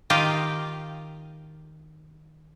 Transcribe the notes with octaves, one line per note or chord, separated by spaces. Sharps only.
D#3 F4 G4 D#5 F5